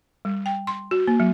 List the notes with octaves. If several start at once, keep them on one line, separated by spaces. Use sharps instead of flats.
G3
G5
C6
F#4
A#3
F#3